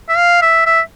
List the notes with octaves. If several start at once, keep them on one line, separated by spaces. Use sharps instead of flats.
E5
F5
E5
E5